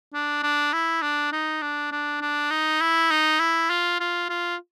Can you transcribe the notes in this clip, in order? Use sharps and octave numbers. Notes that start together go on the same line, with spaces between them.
D4
D4
E4
D4
D#4
D4
D4
D4
D#4
E4
D#4
E4
F4
F4
F4